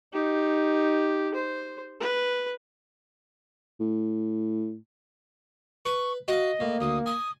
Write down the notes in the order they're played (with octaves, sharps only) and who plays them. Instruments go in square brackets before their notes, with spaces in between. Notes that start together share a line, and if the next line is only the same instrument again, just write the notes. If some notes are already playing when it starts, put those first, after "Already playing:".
[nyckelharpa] D#4 G4
C5
B4
[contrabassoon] A2
[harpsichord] B4 [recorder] C#6
[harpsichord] F#4 F5 [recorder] D#5
[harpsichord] A2 [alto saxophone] A#3
[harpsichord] D2 [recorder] D#6
[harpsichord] G#5 [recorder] D#6